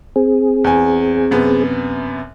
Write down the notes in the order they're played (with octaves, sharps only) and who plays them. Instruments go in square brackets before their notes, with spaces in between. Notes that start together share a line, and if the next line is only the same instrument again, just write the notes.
[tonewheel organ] C4 G#4
[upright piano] E2 G#5
F#2 C3 B3